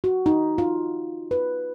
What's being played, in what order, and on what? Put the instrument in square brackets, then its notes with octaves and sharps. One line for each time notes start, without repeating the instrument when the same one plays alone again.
[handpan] F#4
D#4
F4
B4